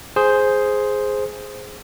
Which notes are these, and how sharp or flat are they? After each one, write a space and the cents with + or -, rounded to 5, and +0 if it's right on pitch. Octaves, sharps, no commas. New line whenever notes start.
G#4 +5 C5 +0